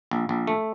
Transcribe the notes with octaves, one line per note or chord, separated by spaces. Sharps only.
A#1
A#1
A3